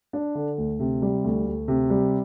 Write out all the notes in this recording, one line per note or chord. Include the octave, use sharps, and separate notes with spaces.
D4
D3
D2
C3
G3
D2
D2
C3
G3